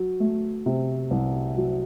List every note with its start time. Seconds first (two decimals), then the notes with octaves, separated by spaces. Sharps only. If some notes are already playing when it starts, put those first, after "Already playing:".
Already playing: F#3
0.20 A3
0.66 C3
1.11 C2
1.57 F#3